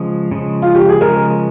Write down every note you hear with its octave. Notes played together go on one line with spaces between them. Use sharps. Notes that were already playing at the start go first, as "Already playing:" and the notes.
Already playing: C#3 F3 G#3
C#3 F3 G#3
F4
G4
G#4
C#3 F3 G#3 A#4